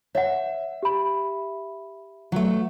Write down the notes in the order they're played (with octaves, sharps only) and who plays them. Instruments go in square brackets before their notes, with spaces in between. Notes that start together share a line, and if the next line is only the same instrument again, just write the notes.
[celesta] C#5 F#5 [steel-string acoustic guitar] E5
[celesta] G4 B5
[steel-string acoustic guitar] F#3 A3